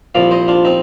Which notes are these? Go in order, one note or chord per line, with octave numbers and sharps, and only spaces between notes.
C2 A#2 F3 D5 F5
C5 D#5
D4 F4
C4 D#4